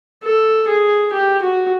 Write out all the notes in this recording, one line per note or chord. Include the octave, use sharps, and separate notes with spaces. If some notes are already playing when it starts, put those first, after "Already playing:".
A4
G#4
G4
F#4